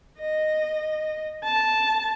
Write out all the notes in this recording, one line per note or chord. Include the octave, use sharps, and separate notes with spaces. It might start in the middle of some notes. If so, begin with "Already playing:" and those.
D#5
A5